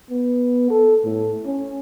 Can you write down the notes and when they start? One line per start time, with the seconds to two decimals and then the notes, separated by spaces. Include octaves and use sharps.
0.10 B3
0.71 A4
1.04 A2
1.45 C#4